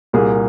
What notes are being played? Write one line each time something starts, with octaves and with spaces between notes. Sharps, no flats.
C2 A#2 A#3 G#4